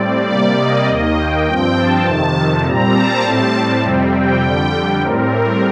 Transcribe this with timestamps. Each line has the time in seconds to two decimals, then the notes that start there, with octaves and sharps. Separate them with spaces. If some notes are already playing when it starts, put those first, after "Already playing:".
Already playing: A2 G3 C4 D5
0.29 C3 G3 A#3 D5
0.58 D#5
0.88 D#2 D#3 A#3
1.17 G5
1.47 G2 F3 C4
1.77 A5
2.06 F2 C3 D#3
2.65 A#2 G3 C4 A#5
2.94 A5
3.24 A2 G3 C4
3.83 F2 C3 G3 C4
4.12 G5
4.42 F2 D3 G3
5.01 A2 G3 C4 A#4